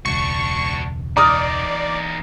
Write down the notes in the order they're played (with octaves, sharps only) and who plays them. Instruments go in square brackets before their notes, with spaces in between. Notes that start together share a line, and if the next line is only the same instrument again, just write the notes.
[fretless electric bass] E1 C#2 [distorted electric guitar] D4 F#4 [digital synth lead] C#6
[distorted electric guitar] E2 D#4 [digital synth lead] D5 [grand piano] A#5 D#6 F6